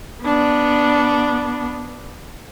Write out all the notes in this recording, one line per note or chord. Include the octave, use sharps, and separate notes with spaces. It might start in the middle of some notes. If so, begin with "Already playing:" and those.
B3 D4